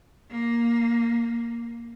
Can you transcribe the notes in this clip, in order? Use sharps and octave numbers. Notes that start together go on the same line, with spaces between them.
A#3